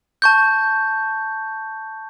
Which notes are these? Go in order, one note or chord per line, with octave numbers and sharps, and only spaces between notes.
A5 C#6 G6